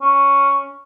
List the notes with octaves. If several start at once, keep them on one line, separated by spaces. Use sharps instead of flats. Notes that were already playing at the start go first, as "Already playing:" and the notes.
C#4